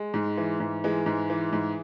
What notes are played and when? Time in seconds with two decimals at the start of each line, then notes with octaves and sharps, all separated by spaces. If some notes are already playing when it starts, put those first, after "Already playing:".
Already playing: G#3
0.14 G#2
0.37 E3
0.60 G#2
0.84 E3 G#3
1.06 G#2
1.30 E3
1.53 G#2